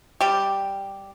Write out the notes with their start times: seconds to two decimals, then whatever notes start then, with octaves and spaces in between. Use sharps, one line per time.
0.21 G3 G4